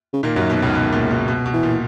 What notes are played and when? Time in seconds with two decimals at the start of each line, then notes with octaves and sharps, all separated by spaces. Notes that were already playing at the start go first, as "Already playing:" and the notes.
0.13 C#3
0.23 A#2 D#3 A#3
0.36 F#2 F#3
0.50 B2
0.62 C#2 C#3
0.75 B2
0.92 A#2
1.11 B2
1.28 B2
1.46 B2
1.53 E3
1.63 A#2